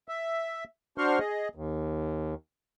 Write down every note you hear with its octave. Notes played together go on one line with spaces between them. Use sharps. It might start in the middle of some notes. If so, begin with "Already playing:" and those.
E5
D4 F#4 C5 C6 C#6 F6
G#4 D#5
D#2